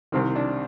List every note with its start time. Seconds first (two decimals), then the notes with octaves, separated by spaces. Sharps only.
0.12 C2 C3 D#3 C4
0.36 D4